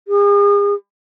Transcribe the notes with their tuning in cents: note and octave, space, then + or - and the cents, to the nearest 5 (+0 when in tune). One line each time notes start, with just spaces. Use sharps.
G#4 -40